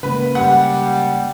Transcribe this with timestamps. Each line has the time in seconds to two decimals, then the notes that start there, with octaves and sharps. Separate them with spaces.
0.03 C#3 G#3 A#3 B4
0.35 G3 F#5